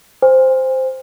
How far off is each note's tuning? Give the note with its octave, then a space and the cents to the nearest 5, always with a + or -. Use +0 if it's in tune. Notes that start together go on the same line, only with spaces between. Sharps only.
C5 -5 G#5 -45